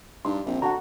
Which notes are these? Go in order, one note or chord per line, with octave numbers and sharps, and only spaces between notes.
G2 D#4 C6
A#1 C4
D3 F#4 F#5 A5 A#5